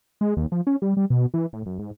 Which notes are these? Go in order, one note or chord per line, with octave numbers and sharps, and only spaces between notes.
G#3
D#2
F3
C#4
G3
G3
B2
E3
A2
F#2
G#2